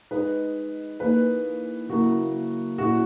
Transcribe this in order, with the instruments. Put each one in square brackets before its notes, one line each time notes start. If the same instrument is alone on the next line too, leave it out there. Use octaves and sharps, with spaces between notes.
[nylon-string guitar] G#3 D#4 G#4 [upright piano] B4
[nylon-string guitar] E3 A#3 D#4 G#4 [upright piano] B4
[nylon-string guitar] C#3 F#3 A#3 E4 A#4 [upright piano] F#4
[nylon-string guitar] A#2 F#3 C#4 E4 G#4 [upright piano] F#4